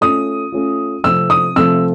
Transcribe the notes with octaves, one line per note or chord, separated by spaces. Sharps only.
A3 C#4 F4 D#6
A3 C#4 F4
C3 F3 A3 C4 E6
D#6
C3 F3 A3 C4 E6